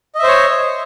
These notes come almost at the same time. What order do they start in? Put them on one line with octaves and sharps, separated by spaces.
D#5 E5 C5 C#5